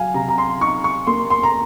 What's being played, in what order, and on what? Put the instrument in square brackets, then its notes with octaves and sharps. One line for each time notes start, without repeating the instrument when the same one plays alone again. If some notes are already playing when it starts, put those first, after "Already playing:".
Already playing: [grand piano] F#3 F5 F#5 G#5
C3 A#5
A#5
C6
D#4 C#6
C#6
A#3 C6
C6
A#5